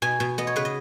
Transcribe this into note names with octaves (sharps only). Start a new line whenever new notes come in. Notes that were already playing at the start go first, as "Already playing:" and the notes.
B2 G#5
B2
B3 D#5
C#5
C#3 B4
D#5